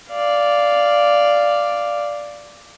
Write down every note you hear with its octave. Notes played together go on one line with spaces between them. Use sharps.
D5 F5